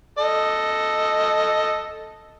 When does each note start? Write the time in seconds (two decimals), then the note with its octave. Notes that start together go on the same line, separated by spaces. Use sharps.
0.18 A4 D#5